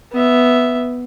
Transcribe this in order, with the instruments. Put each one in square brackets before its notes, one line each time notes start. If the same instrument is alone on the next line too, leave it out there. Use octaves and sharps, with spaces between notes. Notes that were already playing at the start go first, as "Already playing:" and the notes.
[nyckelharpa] B3 E5